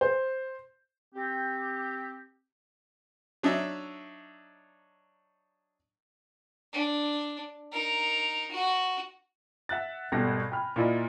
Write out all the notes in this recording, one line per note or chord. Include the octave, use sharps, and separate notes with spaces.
C5
C4 G4
F#3 D4 D#4 E5
D4
D#4 A#4
F#4
E5 F#5 F#6 A6
G#1 B2 G3 A4 A#6
G5 G#5 B5 F6
A#2 E4 D5 D#5